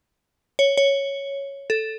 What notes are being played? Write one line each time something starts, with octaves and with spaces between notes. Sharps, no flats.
C#5
C#5
A4